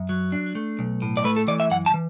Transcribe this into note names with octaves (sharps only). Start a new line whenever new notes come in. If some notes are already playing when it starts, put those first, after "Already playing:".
Already playing: F#2
F#3
D4
A3
B1
A2
D5
A3 B4
A4
E3 D5
E5
F#2 F#5
A5
E3